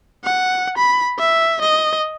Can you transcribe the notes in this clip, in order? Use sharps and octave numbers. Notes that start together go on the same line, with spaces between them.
F#5
B5
E5
D#5